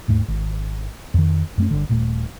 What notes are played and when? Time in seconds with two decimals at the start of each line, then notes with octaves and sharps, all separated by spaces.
0.08 D#2 G#2 A3
0.28 G#1
1.14 F2 D#3
1.58 F#2 A3 C#4
1.70 G1 D3
1.89 D#1 A#2 A3